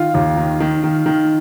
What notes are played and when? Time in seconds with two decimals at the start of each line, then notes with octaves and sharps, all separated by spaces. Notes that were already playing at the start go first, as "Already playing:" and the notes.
Already playing: D#3 F4
0.14 D#2
0.37 D#3
0.60 D#3
0.84 D#3
1.06 D#3